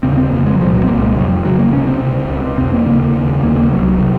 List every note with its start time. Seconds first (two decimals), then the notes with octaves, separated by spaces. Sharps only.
0.03 D#2 C#3 C4
0.18 C4
0.32 F2 C#3 A#3
0.46 G#3
0.55 F#3
0.60 C2 A#2 F3
0.74 F#3
0.83 C4
0.88 C2 A#2 A#3
1.02 G#3
1.16 F2 C3 F#3
1.45 F2 C#3 F#3
1.59 A#3
1.73 C#2 C3 C#4
1.87 C4
2.02 C#2 C3
2.30 C#2 C#3
2.58 F2 C3 C4
2.73 A#3
2.86 D#2 C#3 A#3
3.15 D#2 C#3
3.43 D#2 C#3 A#3
3.57 A#3
3.71 C2 C3 F#3
4.00 C3